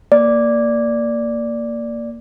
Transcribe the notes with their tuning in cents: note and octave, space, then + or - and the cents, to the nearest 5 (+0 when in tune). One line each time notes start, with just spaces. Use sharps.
A#3 -5 D5 -5